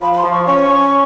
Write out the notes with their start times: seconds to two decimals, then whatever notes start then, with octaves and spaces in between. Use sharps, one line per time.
0.01 F3 B5
0.13 B5
0.17 C6
0.24 F3
0.32 C#6
0.47 C#4 C#6
0.69 C#4